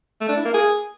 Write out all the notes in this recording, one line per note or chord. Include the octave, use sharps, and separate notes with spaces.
A3
D4
E4
A#3
G#4